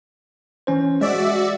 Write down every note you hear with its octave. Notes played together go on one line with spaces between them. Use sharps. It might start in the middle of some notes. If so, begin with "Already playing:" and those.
E3 C#4 C5
G#3 F#4 D5 E5